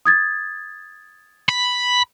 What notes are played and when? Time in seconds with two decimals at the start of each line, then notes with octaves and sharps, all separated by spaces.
0.05 D#6 G#6 A6
1.49 B5